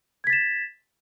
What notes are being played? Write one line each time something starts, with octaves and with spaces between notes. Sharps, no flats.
G#6 A6 B6 E7